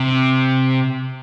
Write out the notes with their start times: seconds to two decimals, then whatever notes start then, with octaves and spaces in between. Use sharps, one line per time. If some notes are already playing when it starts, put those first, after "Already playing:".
Already playing: C3